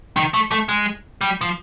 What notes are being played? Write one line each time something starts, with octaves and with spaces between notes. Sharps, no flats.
D#3
A3
A3
G#3
G3
F3